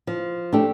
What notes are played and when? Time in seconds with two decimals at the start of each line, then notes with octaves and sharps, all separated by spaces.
0.07 F3
0.53 A3 D4 G4